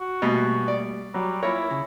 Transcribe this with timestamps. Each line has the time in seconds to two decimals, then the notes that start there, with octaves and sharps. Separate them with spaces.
0.01 F#4
0.22 B2 G3 A3 A#3
0.68 D5
1.14 F#3 G3
1.43 E4 F4 A#4 C#5
1.71 C#3